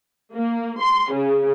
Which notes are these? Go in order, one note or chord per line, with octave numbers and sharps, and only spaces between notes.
A#3
C6
C#3